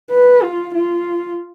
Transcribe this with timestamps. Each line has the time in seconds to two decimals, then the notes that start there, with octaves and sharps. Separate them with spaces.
0.11 B4
0.43 F4
0.74 F4